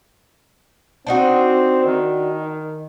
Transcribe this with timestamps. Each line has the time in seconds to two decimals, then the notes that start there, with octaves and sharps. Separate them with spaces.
1.07 C4 D4 D#4 F#4
1.85 D#3